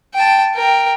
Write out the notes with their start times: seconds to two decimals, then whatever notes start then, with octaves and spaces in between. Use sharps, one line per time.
0.14 G5 A5
0.55 A#4 G5